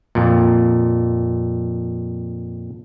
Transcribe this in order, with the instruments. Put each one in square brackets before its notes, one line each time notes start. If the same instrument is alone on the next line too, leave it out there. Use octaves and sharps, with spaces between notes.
[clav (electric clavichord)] F2 A#2